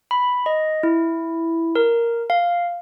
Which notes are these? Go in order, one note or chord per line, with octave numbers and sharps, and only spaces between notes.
B5
D#5
E4
A#4
F5